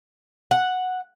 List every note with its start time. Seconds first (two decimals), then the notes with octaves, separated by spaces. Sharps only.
0.51 F#5